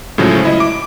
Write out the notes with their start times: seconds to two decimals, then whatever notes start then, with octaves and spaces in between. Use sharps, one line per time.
0.18 A2 C#3 F3 F#3 G#3
0.45 E4 D#5
0.60 D6